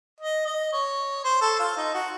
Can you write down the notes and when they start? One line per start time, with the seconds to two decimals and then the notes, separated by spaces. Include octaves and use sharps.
0.21 D#5
0.46 D#5
0.73 C#5
1.24 C5
1.41 A4
1.59 F4
1.77 D#4
1.94 F#4